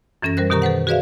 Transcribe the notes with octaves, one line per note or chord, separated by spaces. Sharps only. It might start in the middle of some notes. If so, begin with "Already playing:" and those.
F#2 E3 C#4 A4 A#6
G3 A#4 C5 F#6
B2 D#3 G4 A#4 A#5 C#6
A4 B4 C5 F#5
F#4 G#4 B4 D5 E5 F5